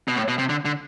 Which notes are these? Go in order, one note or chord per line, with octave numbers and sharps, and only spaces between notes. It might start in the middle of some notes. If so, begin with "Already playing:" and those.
B2
A2
B2
C3
D3
D3